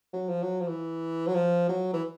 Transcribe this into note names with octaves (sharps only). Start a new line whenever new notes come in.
F#3
F3
F#3
F3
E3
F#3
F3
F#3
E3